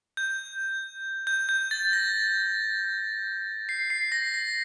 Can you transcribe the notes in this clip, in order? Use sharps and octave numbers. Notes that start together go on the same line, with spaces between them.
G6
G6
G6
A6
A#6
C7
C7
A#6
A#6